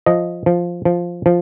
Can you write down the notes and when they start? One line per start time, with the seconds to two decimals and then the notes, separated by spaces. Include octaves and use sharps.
0.06 F3 D#5
0.46 F3
0.85 F3
1.26 F3